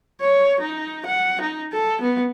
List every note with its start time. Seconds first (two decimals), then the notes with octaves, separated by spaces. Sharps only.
0.21 C#5
0.61 D#4
1.06 F#5
1.41 D#4
1.72 A4
2.01 B3